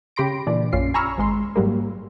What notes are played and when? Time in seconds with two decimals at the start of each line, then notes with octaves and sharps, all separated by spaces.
0.16 C#3 G4 B5 C6 A#6 D7
0.47 A#2 E3 D4 D5
0.73 A#1 F#2 C#4 F4 C7
0.94 G#5 A#5 B5 C#6 E6 F6
1.18 G#1 G#3 C6
1.56 G#2 F#3 G3 A#3